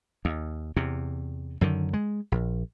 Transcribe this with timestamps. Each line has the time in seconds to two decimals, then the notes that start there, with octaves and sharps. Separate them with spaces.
0.25 D#2
0.76 E2 C3
1.61 F#2 D3 D#3
1.93 G#3
2.32 A#1